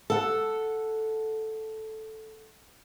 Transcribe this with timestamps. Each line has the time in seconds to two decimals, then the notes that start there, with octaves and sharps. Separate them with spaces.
0.10 A4 F#5